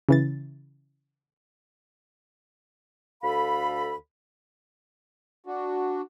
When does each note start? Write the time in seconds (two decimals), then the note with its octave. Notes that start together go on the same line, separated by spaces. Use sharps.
0.09 C#3 E3 A6
3.22 D2 A4 F5 B5
5.46 D4 F#4